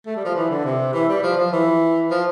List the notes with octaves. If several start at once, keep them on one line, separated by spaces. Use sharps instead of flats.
A3
G3
F3
E3
D3
C3
E3
G3
F3
F3
E3
F3